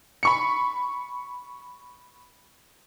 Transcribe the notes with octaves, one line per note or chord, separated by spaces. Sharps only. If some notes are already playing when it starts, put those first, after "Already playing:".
B5 C#6 C#7